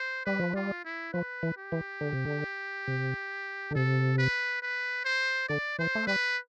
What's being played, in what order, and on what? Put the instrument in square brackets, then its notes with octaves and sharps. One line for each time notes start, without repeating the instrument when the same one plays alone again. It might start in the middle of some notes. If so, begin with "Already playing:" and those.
Already playing: [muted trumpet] C5
[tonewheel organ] G3 [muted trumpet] B4
[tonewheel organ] F3
[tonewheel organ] G3 [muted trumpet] F4
[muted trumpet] E4
[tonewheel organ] F3 [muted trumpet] B4
[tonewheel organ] E3
[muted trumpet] G4
[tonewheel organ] E3
D3
C3
D3
C3
D3
[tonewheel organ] C3 [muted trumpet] A4
[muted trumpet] B4
B4
C5
[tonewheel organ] D3 [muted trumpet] D5
[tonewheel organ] E3 [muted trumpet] C5
[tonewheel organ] A3
[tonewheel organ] G3 [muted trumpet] B4